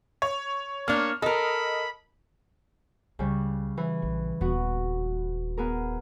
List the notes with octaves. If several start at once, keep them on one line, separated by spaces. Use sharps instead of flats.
C#5
A#3 D4 C#5 F6
A4 A#4 D#5 B5
C#2 C#3 G3
E3
A#1
D#1 B3 F#4
B3 G#4 A#4